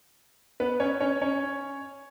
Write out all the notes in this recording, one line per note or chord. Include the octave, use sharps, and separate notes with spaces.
B3 B4
C#4 C#5
C#4 C#5
C#4 C#5